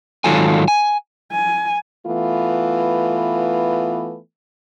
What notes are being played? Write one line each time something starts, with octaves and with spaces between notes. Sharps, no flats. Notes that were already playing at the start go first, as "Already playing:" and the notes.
G#2 D#3 F#3 F4 A4 G#5
G#5
G#5
E3 A3 B3 F4